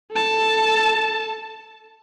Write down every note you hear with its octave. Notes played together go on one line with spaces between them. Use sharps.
A4 A5